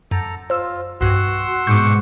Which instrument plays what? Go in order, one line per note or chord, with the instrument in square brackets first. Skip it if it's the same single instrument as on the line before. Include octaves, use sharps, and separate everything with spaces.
[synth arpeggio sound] F#2 [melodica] A4 A#5
[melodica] F4 [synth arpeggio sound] C5 E6
[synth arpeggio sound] B1 G2 [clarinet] F#4 [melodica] F#5 C6 E6
[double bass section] G#2 B2 [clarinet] C#6 [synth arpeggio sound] D6 G6